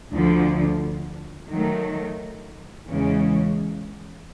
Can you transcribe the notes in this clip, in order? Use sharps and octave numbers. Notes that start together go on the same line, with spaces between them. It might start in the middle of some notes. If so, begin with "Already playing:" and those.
D2 D3 F3
D#3 F#3 A3
E2 C#3 E3 G#3 C#4